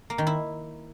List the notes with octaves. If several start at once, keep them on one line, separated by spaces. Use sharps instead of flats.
A#3
D#3
E4